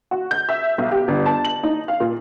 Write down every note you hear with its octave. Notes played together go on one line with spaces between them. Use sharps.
F#4
G6
E5
B1
G4
G1
A5
F#7
D#4
F5
A#2